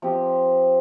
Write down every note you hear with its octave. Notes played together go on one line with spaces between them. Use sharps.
F3 C4 G4